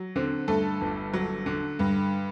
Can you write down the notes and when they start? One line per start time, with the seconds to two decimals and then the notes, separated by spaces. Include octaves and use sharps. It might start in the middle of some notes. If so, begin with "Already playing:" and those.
Already playing: F#3
0.16 D3 C4
0.48 G2 A3 A4
0.81 G1
1.14 F#3
1.46 D3
1.79 G2